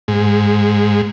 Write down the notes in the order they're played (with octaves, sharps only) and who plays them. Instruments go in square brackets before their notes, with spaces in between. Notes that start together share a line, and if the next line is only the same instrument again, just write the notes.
[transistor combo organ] G#2